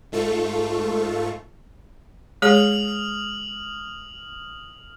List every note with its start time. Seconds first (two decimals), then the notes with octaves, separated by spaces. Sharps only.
0.12 G#2 A3 F4 A4 C#6
2.42 G#3 G#4 C#5 D#6 F6 F#7